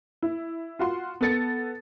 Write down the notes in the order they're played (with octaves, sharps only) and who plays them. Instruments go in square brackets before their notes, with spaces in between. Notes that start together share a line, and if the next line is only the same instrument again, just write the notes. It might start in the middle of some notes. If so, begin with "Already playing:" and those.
[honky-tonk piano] E4
F4 F#4 C6
B3 A4 A6 C#7